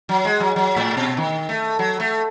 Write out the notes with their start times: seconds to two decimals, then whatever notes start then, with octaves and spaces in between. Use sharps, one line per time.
0.09 F#3
0.25 G#3
0.40 F#3
0.56 F#3
0.76 A2
0.97 B2
1.17 D#3
1.49 A3
1.79 F#3
2.00 A3